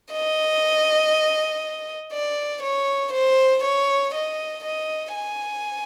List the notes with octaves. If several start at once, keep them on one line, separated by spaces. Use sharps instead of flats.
D#5
D5
C#5
C5
C#5
D#5
D#5
G#5